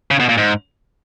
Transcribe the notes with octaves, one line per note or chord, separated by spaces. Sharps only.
C#3
B2
A#2
G#2